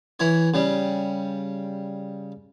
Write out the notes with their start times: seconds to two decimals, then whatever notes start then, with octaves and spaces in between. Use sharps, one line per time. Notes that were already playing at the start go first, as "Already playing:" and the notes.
0.20 E3 E4 C#5
0.54 C#3 G3